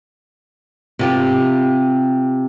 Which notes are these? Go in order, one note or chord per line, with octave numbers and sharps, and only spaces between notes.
C3 F4 G4